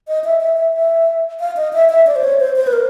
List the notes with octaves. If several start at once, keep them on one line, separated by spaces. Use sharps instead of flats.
D#5
E5
E5
E5
E5
F5
D#5
E5
E5
D5
C5
C#5
C5
C5
B4
A#4